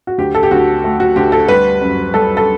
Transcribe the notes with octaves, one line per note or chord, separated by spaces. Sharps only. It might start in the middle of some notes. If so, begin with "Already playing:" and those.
F#4
D2 G4
A4
G4
D2 F#4
A3
F#4
D2 G4
A4
G3 B4
F#2
G3 A4
A4